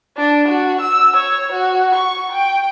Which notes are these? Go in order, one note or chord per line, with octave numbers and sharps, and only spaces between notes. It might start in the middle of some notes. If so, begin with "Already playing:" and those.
D4
F#4
E6
C#5
F#4
C#6
G5